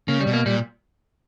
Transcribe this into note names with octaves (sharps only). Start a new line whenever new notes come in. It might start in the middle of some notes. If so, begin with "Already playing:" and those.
C#3 A#3
G3
B2
A#3
A#2 G3